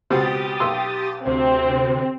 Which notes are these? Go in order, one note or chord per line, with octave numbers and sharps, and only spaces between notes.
C#2 B2 C4 G4 D#6 A6
B1 C6 E6
D2 C3 C4